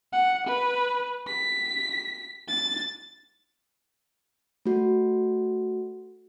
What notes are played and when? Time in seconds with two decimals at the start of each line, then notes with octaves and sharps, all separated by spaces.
0.13 F#5
0.48 B4
1.27 B6
2.48 A6
4.66 A3 F#4